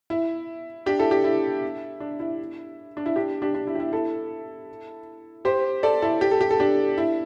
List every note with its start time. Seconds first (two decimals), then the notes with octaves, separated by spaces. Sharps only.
0.10 E4
0.86 D4 G4
0.99 E4 A4
1.11 D4 G4
1.24 E4
2.00 D4
2.20 E4
2.97 D4
3.06 E4
3.16 D4 G4
3.42 D4 G4
3.55 D4
3.67 E4
3.75 G4
3.80 E4
3.93 E4 A4
5.45 G4 C5
5.83 A4 D5
6.02 E4 A4
6.21 G4
6.31 A4
6.41 G4
6.51 A4
6.60 D4 G4
6.98 E4